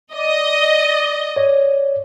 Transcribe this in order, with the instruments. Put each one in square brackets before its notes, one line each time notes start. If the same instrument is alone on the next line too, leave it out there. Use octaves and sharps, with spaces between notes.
[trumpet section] D5 [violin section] D#5
[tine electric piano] C#5 D5